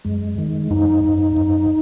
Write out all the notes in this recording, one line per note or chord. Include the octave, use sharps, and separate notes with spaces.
F#2 G#3
D#3
F#2 D#4
F#2
F#2